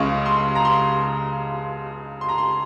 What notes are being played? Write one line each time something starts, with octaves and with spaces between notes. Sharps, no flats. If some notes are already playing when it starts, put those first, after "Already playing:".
Already playing: C#2 C#3 G#3 C#6
C6
A#5
C6
C6
A#5
C6